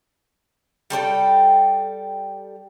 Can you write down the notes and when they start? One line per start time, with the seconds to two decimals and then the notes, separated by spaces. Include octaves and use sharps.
0.90 G3 A4 C5 G5